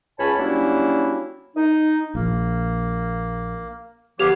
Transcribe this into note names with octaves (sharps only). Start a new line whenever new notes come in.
C#2 C#4 C#5 G#5 A5 B5
F#3 G3 A#3 C#4 D4 E4
D#4
A#1 A#3
D3 F3 B3 G4 C#5 F5 D6 F7